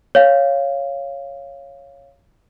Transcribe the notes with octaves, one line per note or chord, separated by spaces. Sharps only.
C#5 F5